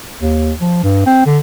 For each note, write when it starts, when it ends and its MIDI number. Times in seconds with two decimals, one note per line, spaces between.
0.22 0.53 39
0.61 0.81 53
0.84 1.06 43
1.06 1.23 60
1.26 1.39 50